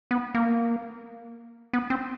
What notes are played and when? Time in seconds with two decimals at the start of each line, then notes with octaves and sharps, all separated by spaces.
0.11 B3
0.34 A#3
1.73 B3
1.90 C4